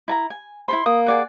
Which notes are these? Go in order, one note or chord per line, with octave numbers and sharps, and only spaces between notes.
E4 A5 A#5
G#5
E4 A4 B5 C6
A#3 D#6
G#4 D5 F#5